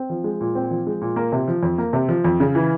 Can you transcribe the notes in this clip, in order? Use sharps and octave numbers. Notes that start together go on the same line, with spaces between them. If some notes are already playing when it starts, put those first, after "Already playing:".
Already playing: C4
F3
G#3
A#2
C4
F3
G#3
A#2
A#3
C3
F3
F2
A#3
C3
F3
F2
C#3
E3